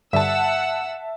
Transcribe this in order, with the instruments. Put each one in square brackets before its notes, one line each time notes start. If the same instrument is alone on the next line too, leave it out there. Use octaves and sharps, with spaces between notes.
[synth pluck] G2 D3 [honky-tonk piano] E5 A5 [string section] F#5 E6